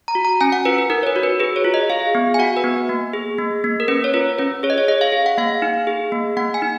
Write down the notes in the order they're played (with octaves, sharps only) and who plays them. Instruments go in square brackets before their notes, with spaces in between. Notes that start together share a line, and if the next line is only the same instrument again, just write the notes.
[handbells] A#5
F#4
A#5
C#4 G#5
F#5
F4 B4
B4
D#4 A#4
C#5
B4
F#4
B4
G#4 B4
C#5
F4
D#5
G#4 F5
B3
G#5
F#4 F#5
B4
B3
A#3
G#4
A#3
A#3
A#4
C#4 B4
C#5
F4 B4
C#4 B4
G#4 C#5
D#5
C#5
G#4 D#5
F5
G#4
F#5
A#3 F5
D#4
G#4
A#3
A#3 F#5
G#5
D#4